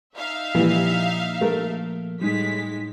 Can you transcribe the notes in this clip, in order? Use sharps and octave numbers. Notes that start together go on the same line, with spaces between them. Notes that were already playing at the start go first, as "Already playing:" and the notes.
D#4 E5 F5
A#2 E3 F3 G3 A#3
A3 A#4
A2 G3 G#3 D#4 B6